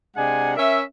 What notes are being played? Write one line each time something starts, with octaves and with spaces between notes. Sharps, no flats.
C3 G#3 D4 F#5 G#5
C#4 A#4 E5